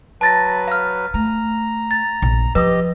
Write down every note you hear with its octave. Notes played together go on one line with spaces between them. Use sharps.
F#3 B4 A5 A6 A#6
F5 F6
A3 A#5
A6
A#1
F3 G4 B4 D#5 D#6